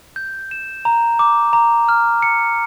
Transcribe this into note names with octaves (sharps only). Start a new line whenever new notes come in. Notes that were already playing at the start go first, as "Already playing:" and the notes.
G6
E7
A#5
D6
A#5
F6
C#7